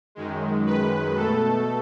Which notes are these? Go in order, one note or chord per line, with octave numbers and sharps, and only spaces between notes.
F#2 D#3 G#3
B4
B2 A3 A4